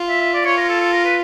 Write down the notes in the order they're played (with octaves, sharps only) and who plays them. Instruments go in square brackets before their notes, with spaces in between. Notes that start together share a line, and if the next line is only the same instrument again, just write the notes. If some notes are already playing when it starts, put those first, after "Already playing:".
Already playing: [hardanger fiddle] F4
[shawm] E5
E5
D5
[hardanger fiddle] F4 [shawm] C#5
[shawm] A#4
A4
A4
A#4
B4